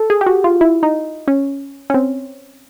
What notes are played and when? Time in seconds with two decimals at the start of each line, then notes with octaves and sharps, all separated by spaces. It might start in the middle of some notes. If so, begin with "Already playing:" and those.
Already playing: A4
0.10 G#4
0.21 G4
0.26 F#4
0.44 F4
0.61 E4
0.83 D#4
1.28 C#4
1.90 C#4
1.94 C4